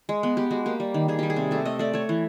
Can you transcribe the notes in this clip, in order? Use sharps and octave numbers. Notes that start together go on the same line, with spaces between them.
G#3
B3
B3 G4
G#3 F#4
A#3 G4
G3
D#3
D#3 G#4
G3 G4
G#4
C3
A3 A4
A3 D#5
A3 D5
A3 C#5
E3